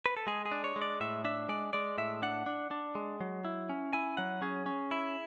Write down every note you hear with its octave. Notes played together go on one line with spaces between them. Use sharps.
B4
A4
G#3 G#4
G#4
D4
C#5
G#3
D5
A2 E5
D4 E5
G#3 D5
G#3 D5
A2 E5
D4 F#5
D4
D4
G#3
F#3
E4
C#4
E4 G#5
F#3 F#5
C#4 G#4
C#4
E4